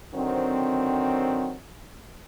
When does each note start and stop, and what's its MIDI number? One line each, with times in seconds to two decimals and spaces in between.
0.14 1.54 50
0.14 1.54 51
0.14 1.54 54
0.14 1.54 60